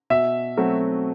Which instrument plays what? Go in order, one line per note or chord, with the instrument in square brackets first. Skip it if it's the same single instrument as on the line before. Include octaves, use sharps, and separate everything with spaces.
[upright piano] B2 [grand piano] E5
[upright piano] F#3 A3 C4 F#4